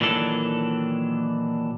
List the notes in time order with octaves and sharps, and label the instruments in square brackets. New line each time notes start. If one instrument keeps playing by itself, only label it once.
[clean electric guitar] A#2 D#3 E3 F#3 D4 A4